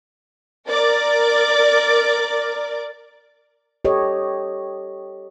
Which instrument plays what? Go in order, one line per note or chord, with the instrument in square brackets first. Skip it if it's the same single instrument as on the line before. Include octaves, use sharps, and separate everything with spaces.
[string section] A#4 D5
[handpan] G4 A4 C#5 D#5